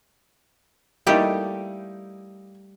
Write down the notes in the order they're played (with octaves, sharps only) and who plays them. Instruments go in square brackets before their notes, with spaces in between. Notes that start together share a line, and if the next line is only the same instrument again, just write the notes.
[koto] G3 A3 G4 [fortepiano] A#3 D#4 E4